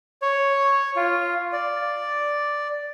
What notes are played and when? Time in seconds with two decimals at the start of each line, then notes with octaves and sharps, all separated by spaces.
0.22 C#5
0.96 F4
1.53 D5